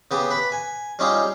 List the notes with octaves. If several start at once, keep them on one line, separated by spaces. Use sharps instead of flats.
C#3 B3 G4 D#6
B4 B5
G#5
G3 C#4 D#4 F4 G4 G#4